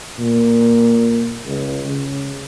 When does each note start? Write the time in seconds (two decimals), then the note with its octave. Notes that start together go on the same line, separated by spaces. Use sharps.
0.19 A#2
1.45 C#2
1.85 C#3